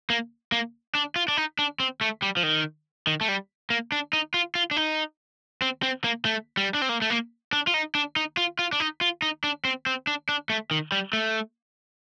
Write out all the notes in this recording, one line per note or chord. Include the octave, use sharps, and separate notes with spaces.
A#3
A#3
D4
F4
D4
D#4
D4
C4
A3
G3
F3
D#3
D#3
A3
G3
A#3
D4
D#4
F4
F4
D4
D#4
C4
C4
A#3
A3
G3
D4
C4
A#3
A3
A#3
D4
F4
D#4
D4
D#4
F4
F4
D4
D#4
F4
D#4
D4
C4
C4
D4
D4
A3
D#3
G3
A3